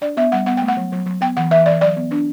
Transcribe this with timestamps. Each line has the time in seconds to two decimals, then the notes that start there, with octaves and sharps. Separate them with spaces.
0.01 D4 D5
0.17 B3 E5
0.32 G3 F#5
0.46 B3 F#5
0.57 A3 G5
0.68 F#5
0.77 F#3
0.92 F#3
1.06 F#3
1.21 B3 G5
1.37 E3 F#5
1.51 E3 E5
1.66 E3 D5
1.81 F#3 D5
1.97 B3
2.11 D4